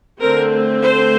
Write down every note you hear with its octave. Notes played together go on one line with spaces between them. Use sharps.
D3 A3 C4 A#4
C5